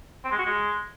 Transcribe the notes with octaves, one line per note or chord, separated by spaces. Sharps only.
C4
G#3
F#4
G#3